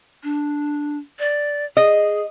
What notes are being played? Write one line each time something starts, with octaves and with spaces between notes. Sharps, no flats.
D4
D5
G#4 D#5